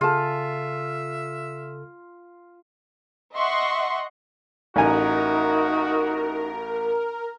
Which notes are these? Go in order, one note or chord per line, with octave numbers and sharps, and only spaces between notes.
C#3 F4 G#4 A4 E5 A5
D#5 E5 F#5 C6 C#6
A1 D#4 F#4 A#4 G#5